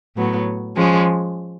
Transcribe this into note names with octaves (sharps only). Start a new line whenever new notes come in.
A2 F#3 B3
F3 G#3 C#4